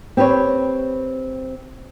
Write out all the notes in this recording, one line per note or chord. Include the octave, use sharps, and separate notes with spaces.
C4 G4 B4 C#5